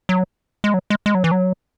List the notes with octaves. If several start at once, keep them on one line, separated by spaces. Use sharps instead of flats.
F#3
G#3
F#3
G#3
G#3
F#3
E3
F#3